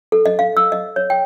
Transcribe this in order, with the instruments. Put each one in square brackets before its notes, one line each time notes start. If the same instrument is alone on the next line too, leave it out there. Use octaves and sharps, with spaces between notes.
[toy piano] A4
D#5
F5
E6
D#5
C#5
G5